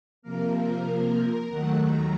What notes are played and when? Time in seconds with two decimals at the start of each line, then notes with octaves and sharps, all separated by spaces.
0.22 C3 F3 A#3 A#4
1.49 D#2 D#3 F#3 A3 F#5
1.81 A#5